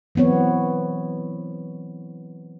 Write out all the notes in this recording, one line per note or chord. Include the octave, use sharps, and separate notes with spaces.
E3 F#3 B3 C4 C#5